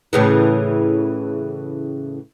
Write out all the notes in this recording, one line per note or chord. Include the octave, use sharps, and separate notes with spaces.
A2 C#3 E3